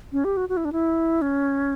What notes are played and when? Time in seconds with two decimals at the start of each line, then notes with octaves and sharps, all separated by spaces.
0.13 C#4
0.25 G4
0.37 F#4
0.49 F#4
0.57 E4
0.65 D4
0.73 E4
1.22 C#4